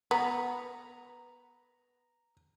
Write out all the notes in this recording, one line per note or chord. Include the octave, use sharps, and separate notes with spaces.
B3 A#5